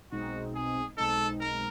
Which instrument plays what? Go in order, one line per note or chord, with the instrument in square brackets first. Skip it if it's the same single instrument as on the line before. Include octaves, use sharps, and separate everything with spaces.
[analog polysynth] B1 B2 G#3 C4 D#4 [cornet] F#4
[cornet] G#4
[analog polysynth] B1 B2 G#3 C4 D#4 [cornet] A4
[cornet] A#4